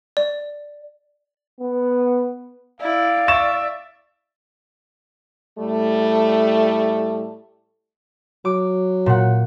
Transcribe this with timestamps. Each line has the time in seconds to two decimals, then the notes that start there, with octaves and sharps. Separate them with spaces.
0.17 D5
1.61 B3
2.80 E4 D5 F5
3.28 E5 C#6 A6 E7
5.59 A2 G3 A3
8.45 F#3 D6
9.06 A#2 F#5